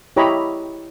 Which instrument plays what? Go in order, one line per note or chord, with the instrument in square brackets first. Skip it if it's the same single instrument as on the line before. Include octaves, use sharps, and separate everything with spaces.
[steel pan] E4 G4 C#5 D#5 A#5 B5